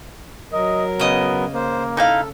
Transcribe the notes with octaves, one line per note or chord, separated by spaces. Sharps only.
F#3 A#4 D#5
C#3 B3 D#5
A#3 C5
D#4 E4 A4 F5